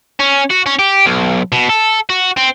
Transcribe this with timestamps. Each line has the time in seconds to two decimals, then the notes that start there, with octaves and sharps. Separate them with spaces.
0.19 C#4
0.51 F#4
0.66 C#4
0.79 G4
1.06 B1
1.52 B2
1.69 A4
2.10 F#4
2.37 C4